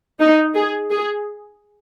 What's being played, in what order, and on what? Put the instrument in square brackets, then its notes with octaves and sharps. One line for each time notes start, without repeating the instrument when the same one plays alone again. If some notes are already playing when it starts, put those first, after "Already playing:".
[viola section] D#4
G#4
G#4